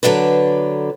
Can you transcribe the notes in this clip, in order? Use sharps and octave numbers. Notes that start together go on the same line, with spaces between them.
D3 F#3 D4 A4 B4